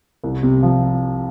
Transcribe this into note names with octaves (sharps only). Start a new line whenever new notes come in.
C2
C3
F3